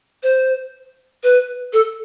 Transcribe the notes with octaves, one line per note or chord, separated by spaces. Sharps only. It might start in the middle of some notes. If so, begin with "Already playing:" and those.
C5
B4
A4